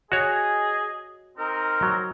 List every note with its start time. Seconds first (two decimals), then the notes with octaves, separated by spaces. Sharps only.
0.12 F#4 G#4 C#5 D#5
1.38 C4 D#4 A#4
1.83 F#3